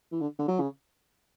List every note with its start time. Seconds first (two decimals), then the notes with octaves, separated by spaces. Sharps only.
0.12 E3
0.21 D3
0.39 D3
0.48 F#3
0.59 C#3